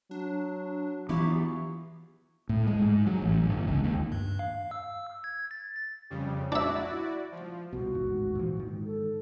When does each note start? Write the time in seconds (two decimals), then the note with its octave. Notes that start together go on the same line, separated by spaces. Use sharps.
0.11 F#3 D4
1.09 E3 F#3 B3 E4 F4 G4
2.49 A2
2.67 G#3
2.82 G#2
3.06 F#3
3.22 A1
3.47 G1
3.68 C#2
3.84 D#2
4.12 G2
4.39 F5
4.71 E6
5.24 G#6
5.51 A6
6.10 F2 C#3 G3
6.52 D4 E4 F#4 D5 E5
7.32 F3
7.73 C2 B2 F#4
7.94 A1 D#2 G#2
8.35 A#2 E3 F3
8.57 G#2 D#3
8.86 A4